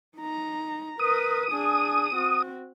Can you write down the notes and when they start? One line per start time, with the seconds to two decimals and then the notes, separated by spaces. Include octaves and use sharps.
0.18 D#4 A#5
0.99 A#4 B4 D#6
1.51 D4 G#4
2.14 C4 F#4